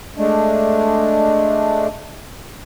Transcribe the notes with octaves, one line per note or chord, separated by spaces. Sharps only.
G#3 A3 D4